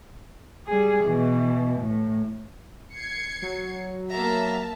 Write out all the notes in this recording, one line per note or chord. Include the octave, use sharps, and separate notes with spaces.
G3 G#4
B2 E3
A2
G#6 C7 C#7
F#3
A#3 E5 A5 A#5